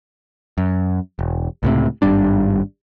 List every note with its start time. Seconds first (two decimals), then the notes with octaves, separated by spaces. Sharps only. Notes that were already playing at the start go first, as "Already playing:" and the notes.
0.58 F#2
1.19 E1
1.63 C#2 A2 C3
2.02 G#1 G2 G3 D4